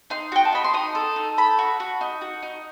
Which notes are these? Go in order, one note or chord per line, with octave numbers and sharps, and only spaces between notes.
D#4 C6
F#4 G5
A5
D#4 B5
C6
D#4 D#6
A4
D#4
A4 B5
F#4
F#4
D#4
F#4
D#4